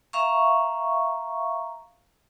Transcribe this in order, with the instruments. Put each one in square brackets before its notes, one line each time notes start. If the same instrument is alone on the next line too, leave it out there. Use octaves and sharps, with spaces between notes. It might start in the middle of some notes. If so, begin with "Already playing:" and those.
[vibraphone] E5 F5 A#5 C#6